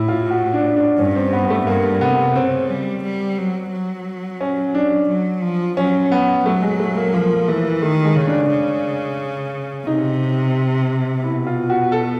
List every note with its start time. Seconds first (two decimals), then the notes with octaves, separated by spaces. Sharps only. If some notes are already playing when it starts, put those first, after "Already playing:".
Already playing: A2 E4
0.08 F4
0.31 F#4
0.53 D4
0.76 D4
0.99 G2 C#4
1.16 C4
1.33 B3
1.50 A3
1.67 G2 A#3
2.01 C3 B3
2.35 C#3 C4
2.69 G3
3.04 G3
3.38 F#3
3.72 F#3
4.41 C#4
4.75 D4
5.09 F#3
5.43 F3
5.77 F#3 C#4
6.12 B3
6.45 F#3 A3
6.62 G#3
6.79 A3
6.97 A#3
7.14 F3 A#3
7.48 E3 A3
7.82 D#3 A3
8.05 G#3
8.16 C#3
8.27 D4
8.50 C#3
9.87 C3 D#4
11.24 B2 E4
11.47 F4
11.70 F#4
11.92 A4